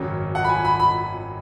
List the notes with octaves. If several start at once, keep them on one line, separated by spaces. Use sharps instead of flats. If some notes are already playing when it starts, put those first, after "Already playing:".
Already playing: G#1 F#2 C#3 F#3 C#4
F#5
B5
G#5
B5
B5